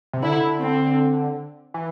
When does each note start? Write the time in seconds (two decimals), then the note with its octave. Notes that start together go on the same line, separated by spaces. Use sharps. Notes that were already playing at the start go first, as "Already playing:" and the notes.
0.13 C3
0.23 D3 E4
0.61 C4
1.74 E3